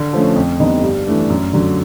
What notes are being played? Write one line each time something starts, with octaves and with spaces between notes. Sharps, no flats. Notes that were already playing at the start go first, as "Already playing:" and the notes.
Already playing: D3
F3 A3 C#4
F2
D3 G3 B3 D#4
G2
E3 A3 D4
F#2
D3 F#3